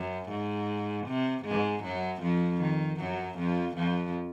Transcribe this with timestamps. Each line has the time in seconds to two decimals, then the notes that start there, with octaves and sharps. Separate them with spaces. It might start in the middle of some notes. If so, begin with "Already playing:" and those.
Already playing: F#2
0.30 G#2
1.07 C3
1.46 G#2 G#3
1.84 F#2 F#3
2.23 F2 F3
2.62 D#3
3.00 F#2 F#3
3.38 F2 F3
3.77 F2 F3